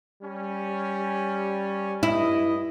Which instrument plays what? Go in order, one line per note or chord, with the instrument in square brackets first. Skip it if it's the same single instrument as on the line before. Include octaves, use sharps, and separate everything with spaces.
[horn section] G3 C#4
[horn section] G2 D#5 [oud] E4